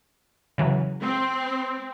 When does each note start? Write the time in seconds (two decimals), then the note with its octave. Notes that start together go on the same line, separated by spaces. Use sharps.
0.58 C#3 E3 F#3
1.02 C4